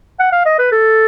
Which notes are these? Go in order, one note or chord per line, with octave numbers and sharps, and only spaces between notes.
F#5
F5
D#5
B4
A4